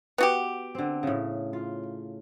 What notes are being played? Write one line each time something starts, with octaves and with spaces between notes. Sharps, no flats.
B3 F#4 G4
D3 C4
A2 C#3
F4